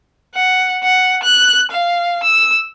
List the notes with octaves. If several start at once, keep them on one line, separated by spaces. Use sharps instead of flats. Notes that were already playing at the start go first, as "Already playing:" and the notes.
F#5
F#5
F#6
F5
E6